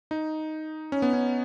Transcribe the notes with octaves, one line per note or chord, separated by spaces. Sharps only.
D#4
C#4
B3
C#4